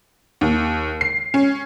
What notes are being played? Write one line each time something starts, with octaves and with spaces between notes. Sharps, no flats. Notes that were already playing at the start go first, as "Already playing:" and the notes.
D#2
C7
C#4